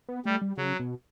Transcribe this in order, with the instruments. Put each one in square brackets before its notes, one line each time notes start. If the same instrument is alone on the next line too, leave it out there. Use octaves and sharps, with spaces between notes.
[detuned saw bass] B3
[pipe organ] G3 [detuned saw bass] A3
[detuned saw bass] G3
[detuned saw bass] C#3 [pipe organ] F#3
[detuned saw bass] B2